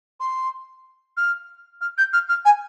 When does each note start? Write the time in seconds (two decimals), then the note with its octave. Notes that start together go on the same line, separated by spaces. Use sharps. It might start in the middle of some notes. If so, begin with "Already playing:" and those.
0.20 C6
1.17 F6
1.81 F6
1.98 G6
2.13 F6
2.29 F6
2.45 G#5